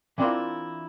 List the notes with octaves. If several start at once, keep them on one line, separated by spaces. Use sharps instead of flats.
E3 C4 D4 E4 F4 A#4